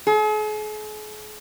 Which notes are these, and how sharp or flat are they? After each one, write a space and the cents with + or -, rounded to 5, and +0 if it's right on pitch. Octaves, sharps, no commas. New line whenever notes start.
G#4 +45